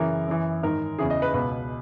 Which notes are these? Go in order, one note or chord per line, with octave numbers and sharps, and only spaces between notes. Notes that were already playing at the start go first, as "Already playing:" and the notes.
Already playing: F#2 C#3 E3 A#4
F#2 E3
G#2 D#3 A#4
E2 C#3 E3 G#4
D#5
B4
C#2 B2 B4